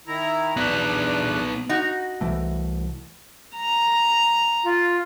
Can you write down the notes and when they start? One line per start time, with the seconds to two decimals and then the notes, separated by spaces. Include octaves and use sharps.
0.07 D#3 E4 A#5
0.57 E2 B3 D4 D#4 F#6
1.69 D#4 F#4
2.21 C2 E3 A3
3.57 A#5
4.64 F4